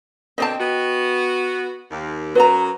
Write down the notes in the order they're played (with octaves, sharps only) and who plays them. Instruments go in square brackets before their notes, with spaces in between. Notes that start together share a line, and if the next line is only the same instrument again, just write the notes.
[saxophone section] B2 D3 C4 [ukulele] D#5 G5 A5
[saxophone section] B3 F#4
D#2
[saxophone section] F#2 F#3 [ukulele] B4 A#5